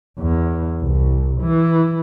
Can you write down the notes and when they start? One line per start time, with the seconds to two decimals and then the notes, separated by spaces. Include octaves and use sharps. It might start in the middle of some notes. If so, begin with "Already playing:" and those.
0.19 E2
0.82 C2
1.41 E3